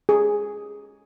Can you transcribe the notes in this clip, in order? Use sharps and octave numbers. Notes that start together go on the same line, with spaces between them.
G#4